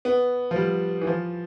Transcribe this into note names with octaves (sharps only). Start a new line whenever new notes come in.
B3
F3
G3
E3
F3